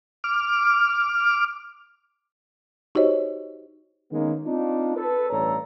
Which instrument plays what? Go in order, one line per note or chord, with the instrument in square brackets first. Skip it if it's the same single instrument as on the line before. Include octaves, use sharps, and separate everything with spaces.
[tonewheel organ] D6 F6
[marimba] D#4 F#4 G4 C5 C#5 D#5
[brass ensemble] D#3 G#3 A#3 B3 C#4 D#4
C4 D4 D#4 F4
A4 B4
A1 G2 A4 C#5 D5 A#5